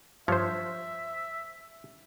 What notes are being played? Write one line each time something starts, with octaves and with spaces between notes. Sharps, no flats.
G2 F3 C5 C#5 E5